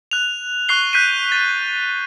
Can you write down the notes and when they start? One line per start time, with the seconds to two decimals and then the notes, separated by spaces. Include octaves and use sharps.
0.11 F#6 F7
0.68 C#6 F#6 C7 G7
0.93 F#6 G6 B6 C7 D#7
1.32 A6 D#7